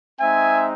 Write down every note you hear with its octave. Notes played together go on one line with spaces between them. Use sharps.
G#3 C4 D#4 E5 G#5